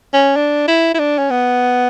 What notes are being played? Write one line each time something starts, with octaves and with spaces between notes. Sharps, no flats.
C#4
D4
E4
E4
D4
C#4
B3